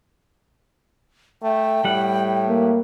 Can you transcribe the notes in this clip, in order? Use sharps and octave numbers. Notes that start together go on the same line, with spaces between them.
A3 G5
A2 G3 F#5
A#3